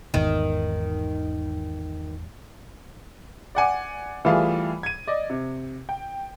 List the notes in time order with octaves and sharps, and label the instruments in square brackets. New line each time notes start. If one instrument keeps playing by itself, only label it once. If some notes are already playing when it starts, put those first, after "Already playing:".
[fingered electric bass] G#1 E2 G#2 [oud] D#3
[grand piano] D5 F#5 G#5 D6
E3 G3 A3 F4 G#4
G#6 D#7
D5 D#5
C3
G5